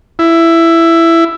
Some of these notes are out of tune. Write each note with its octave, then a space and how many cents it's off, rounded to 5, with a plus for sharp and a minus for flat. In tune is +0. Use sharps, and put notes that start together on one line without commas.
E4 +10